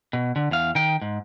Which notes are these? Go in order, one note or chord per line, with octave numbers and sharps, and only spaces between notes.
B2
D3
E2 F5
D#3 G5
G#2